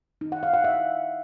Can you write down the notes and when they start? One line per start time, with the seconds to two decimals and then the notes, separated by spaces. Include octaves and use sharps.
0.21 D#4
0.32 F#5
0.43 F5
0.54 F#5
0.64 E5